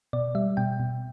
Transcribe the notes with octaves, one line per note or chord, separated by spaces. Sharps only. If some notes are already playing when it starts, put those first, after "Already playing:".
B2 D5
G3 E5
B2 G5
B2